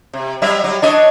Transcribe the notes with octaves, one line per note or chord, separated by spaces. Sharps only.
C3
F#3 G3 E5
F#3 G3
D4 C#5 D#5